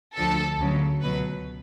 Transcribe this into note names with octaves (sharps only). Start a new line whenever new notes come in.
D2 D3 F3 A4
D2 C#3 F#3
C#2 B2 F#3 B4